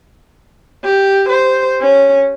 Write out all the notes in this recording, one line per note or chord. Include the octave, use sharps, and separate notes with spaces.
G4
C5
C#4